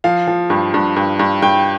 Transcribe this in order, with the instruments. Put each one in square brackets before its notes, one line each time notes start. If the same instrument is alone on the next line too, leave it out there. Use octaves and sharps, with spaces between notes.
[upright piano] F3 F5
F3
G2
G2
G2
G2
G2 G5